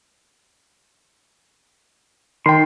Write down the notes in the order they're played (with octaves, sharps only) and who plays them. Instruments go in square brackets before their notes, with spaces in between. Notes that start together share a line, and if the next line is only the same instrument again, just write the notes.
[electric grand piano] D#3 G5 [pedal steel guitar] C6